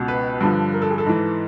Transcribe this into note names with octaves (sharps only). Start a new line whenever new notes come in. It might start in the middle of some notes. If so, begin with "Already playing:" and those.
Already playing: C#2 B2
B4
G2 D3 F3
A#4
A4
G#4
A4
G#2 E3